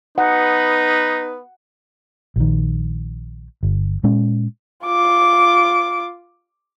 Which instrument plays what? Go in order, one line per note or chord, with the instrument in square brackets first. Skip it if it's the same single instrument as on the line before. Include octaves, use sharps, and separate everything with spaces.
[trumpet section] B3 B4 [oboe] D#4 [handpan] F#5
[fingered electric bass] A#1 D#3
G1
A#2 G#3 C#4
[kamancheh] F4 D6